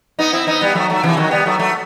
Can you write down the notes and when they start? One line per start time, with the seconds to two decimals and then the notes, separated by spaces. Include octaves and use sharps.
0.19 B3 D#4
0.33 C4 E4
0.47 B3 D#4
0.61 G3 B3
0.75 F#3 A3
0.90 F#3 A3
1.03 C3 E3
1.17 D#3 F#3
1.31 G3 B3
1.46 F#3 A3
1.59 F#3 A3